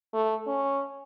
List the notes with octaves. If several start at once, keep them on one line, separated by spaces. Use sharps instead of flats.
A3
C#4